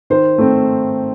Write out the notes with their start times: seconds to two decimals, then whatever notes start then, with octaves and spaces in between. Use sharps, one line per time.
0.10 D#3 C5
0.38 A3 C4